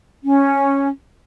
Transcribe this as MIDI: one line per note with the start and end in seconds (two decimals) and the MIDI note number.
0.24 0.88 61